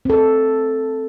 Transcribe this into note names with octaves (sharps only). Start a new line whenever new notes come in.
C4 A4